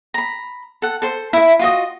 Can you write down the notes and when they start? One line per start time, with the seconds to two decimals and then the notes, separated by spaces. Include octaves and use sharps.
0.14 A#5 B5
0.82 A4 F#5
1.02 A4 C5 C6
1.33 E4 E5
1.59 F4 F#4 D#5